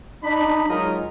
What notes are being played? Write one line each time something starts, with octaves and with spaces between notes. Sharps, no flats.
D4 D#4 B5
F#3 G#3 D#4 F4 A#4 D#5